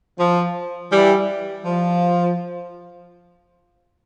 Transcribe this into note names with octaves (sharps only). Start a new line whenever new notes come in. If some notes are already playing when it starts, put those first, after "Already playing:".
F3
E3 G3
F3